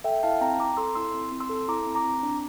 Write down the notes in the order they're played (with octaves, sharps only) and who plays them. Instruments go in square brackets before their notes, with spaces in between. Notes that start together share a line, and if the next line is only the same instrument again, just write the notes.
[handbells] A4 E5 G5
E4 F5 A5
C4 G5 A#5
C4 A#5 D6
A4 C6 E6
E4 C6 E6
C4
C4
C6 E6
A4
E4 A#5 D6
C4
A#5 D6
C4
D4